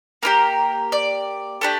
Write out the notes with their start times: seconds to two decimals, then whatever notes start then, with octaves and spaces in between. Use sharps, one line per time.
0.23 A#3 D#4 G4 A#4
0.92 D5
1.61 A3 D4 G4